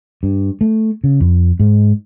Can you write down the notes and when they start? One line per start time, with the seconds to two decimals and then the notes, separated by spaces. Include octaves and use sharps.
0.23 G2
0.61 A3
1.04 C#3
1.21 F2
1.60 G#2